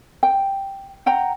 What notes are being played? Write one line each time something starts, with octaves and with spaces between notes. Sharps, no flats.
G5
F#5 G5 A#5